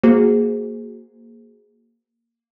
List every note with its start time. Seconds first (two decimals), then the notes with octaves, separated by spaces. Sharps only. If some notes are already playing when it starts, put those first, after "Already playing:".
0.03 A#3 F#4 G#4 C5